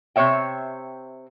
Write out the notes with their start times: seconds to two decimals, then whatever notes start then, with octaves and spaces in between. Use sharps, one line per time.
0.16 C3 C5 C#5 E5 G5